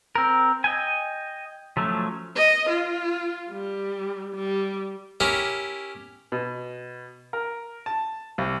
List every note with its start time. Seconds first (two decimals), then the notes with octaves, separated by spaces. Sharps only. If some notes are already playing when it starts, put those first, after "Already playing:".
0.15 C4 A#4
0.64 D#5 G5 G#5
1.77 F3 F#3 A3 C#4
2.36 D#5
2.69 F4
3.50 G3
4.35 G3
5.20 C#4 E4 G4 A#4
6.32 B2
7.33 A#4
7.86 A5
8.38 C2